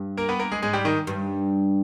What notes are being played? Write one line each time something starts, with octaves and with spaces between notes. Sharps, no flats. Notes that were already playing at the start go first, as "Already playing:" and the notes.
Already playing: G2
A#3 A#4
B3 B4
A#3 A#4
G#3 G#4
G#2 G#3 G#4
G3 G4
D#3 D#4
G2